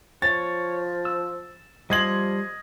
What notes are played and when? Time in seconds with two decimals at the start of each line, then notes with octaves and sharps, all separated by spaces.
0.22 F3 C#5 A6
1.05 E6
1.90 F3 G3 D#5 C6 G#6 F#7